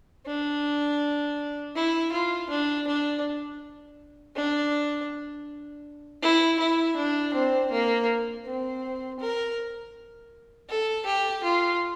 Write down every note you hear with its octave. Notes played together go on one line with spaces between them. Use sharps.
D4
E4
F4
D4
D4
D4
E4
E4
D4
C4
A#3
C4
A#4
A4
G4
F4